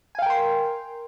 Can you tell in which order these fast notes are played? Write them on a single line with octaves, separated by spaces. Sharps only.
G#5 F5 G5 A#4 C6